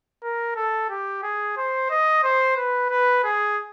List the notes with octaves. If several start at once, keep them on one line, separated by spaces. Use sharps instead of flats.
A#4
A4
G4
G#4
C5
D#5
C5
B4
B4
G#4